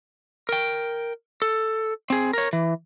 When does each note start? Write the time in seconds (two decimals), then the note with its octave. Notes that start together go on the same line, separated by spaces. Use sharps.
0.49 A#4 G5
1.42 A4
2.10 C4 G#4
2.33 A#4 C#5
2.53 E3